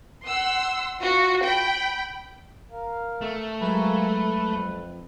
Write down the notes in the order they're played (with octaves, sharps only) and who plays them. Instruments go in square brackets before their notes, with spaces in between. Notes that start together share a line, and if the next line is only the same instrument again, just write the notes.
[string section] F#5 C6 E6
F4 F#4
G5 B5
[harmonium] A#4 F5
[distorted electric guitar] A3
[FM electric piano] F#3 G#3 B5 [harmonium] A#3 G#5 A#5 [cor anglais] B4
[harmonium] F2